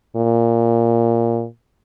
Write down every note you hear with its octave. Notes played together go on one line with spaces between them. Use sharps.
A#2